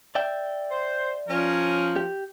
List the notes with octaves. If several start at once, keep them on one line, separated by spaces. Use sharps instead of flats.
D5 E5 G5
C5
F3 C#4 A#4
G4